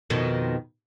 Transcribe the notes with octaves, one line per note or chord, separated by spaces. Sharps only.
F2 B2 D#3